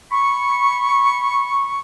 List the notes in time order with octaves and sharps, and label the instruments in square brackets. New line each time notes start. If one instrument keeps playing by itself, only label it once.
[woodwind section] B5 C#6